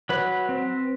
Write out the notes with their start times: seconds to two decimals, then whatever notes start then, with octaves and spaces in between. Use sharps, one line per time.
0.09 F#3 B4
0.49 C4